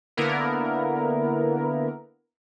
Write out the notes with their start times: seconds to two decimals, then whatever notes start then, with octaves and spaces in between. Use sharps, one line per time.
0.17 D3 A#3 B3 E4 A#4